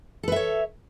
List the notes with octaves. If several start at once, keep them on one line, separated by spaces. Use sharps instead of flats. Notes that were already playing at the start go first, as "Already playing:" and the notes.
A4 B4 C#5 E5